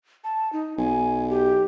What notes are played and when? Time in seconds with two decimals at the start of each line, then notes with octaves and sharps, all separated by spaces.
0.24 A5
0.53 D#4
0.78 B1 G#5
1.29 G4